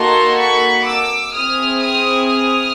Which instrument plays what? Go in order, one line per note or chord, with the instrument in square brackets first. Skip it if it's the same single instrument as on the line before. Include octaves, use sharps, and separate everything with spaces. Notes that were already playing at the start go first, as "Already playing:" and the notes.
Already playing: [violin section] A#3 D#4 F#4 A4 A#5 C6
B5 C#6
D6 E6
C4 E4 G#4 D#6 F6
D#6 F6
D#6 F6